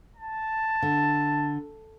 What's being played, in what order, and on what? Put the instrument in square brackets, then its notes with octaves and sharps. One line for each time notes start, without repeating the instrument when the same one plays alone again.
[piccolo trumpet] A5
[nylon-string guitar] D3